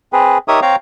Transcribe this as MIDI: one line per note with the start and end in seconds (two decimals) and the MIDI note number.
0.13 0.38 60
0.13 0.38 68
0.13 0.38 71
0.48 0.60 63
0.48 0.60 67
0.48 0.60 70
0.48 0.60 73
0.48 0.60 76
0.48 0.60 87
0.62 0.76 60
0.62 0.76 73
0.62 0.76 77
0.62 0.76 79
0.62 0.76 82